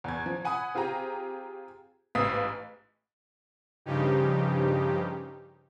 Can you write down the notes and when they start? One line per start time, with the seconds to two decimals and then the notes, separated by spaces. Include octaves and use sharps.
0.04 E2 G#6
0.26 F3
0.45 F#5 G#5 B5 D#6
0.75 C4 F4 G4 G#4 A#5
2.15 A1 G#2 B3 F5 D#6 B6
3.85 G2 C#3 F3 D#4 G4